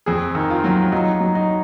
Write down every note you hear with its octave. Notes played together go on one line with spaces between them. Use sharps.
F2 G#4
D#3
F4
F#3
F#3 D#4
F#3
D#4